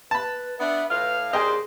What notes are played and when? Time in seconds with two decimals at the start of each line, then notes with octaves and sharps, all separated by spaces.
0.11 B4 A5 B5
0.60 B3 D4 E5
0.91 A2 B4 F5
1.33 D#2 D4 G#4 C5 D#5 G5 G#5